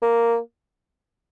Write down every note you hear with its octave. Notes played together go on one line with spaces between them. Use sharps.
A#3